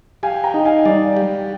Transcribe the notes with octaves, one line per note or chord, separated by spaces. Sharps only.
G4 F5 G#5
G5 A#5
D#4
F5 G#5
G3 D5 F5
G4